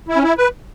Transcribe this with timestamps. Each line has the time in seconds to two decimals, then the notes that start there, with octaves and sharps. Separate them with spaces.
0.09 E4
0.16 C#4
0.23 E4
0.38 B4